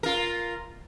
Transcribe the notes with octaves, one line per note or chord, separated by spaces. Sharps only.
F4 A#4